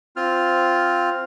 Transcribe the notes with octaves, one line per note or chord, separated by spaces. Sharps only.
C4 F4 F6